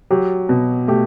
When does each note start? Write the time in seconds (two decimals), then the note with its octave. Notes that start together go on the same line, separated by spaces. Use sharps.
0.11 F#3 G4
0.49 B2
0.88 A3 G4